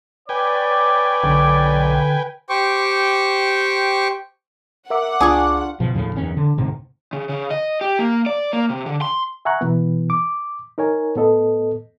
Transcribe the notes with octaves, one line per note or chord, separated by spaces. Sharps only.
B4 C#5 D5 G5 G#5
B1 D3
G4 C5 G5 C#6 D6
A#4 E5 F#5 D6
C#2 D4 F4 G#4 C#6 D6
G1 B2 F3
D#2 A2 C#3 F3
F#1 E2 D#3 C#4
D3
D2 G#2 C3
C#3
C#3
D#5
G4
A#3
D5
A#3
C3
D3
C6
E5 F#5 G#5 A#5 C#6 F#6
B2 E3 B3
D6
D#4 A#4 C#5 G#5
A2 B3 A4 D#5